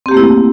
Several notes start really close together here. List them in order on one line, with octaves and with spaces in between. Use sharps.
C4 G4 A#3 A3 E4